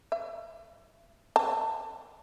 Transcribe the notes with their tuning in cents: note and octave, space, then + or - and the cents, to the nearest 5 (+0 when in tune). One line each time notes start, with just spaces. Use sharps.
E5 +40
A5 +25